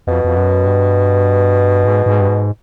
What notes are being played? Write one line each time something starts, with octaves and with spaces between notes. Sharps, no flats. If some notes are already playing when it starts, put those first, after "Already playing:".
F2 B2
F2
F#2
G2
G#2
G#2
G2
G#2